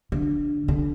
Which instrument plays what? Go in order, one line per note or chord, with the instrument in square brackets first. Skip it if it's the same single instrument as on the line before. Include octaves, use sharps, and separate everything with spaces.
[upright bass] D3
D3